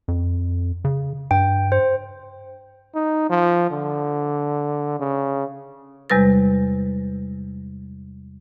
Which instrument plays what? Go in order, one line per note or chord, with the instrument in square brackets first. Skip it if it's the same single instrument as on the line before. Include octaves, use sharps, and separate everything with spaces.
[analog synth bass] F2
C#3
[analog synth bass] G2 [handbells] G5
[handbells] C5
[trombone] D#4
F3
D3
C#3
[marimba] E2 C3 G3 G#3 B4 A6